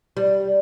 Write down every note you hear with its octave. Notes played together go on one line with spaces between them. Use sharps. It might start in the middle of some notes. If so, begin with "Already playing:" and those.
G3